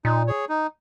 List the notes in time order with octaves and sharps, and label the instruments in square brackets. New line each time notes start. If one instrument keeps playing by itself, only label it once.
[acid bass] A#2 [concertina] D#4
[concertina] G#4 C#5
D#4